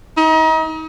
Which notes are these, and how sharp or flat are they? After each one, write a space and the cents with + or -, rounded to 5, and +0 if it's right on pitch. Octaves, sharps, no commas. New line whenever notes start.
D#4 +35